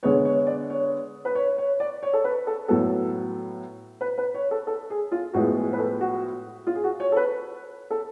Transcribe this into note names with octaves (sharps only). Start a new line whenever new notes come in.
D3 G#3 B3 C#5
C#5
D5
C#5
B4
C#5
C#5
D5
C#5
A4
B4
A4
A2 F#3 B3 A4
B4
B4
C#5
A4
A4
G#4
F4
A2 F3 G#3 B3 F#4
G#4
B4
A4
F#4
F4
G#4
F#4
C#5
A4
B4
A4